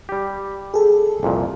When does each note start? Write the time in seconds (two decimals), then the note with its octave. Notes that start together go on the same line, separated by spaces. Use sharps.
0.09 G3 G4
0.74 G#4 A4
1.23 C2 F2 A#2